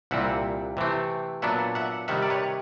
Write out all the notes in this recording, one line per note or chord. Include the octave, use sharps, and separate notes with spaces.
C2 A#2 G3 C4 E5 F#5
C3 E3 A3 C4
A#2 F#3 B3 D4 E5 F#5
E5 F#5
C3 D#3 G3 E5 F#5
D5
B4 C#5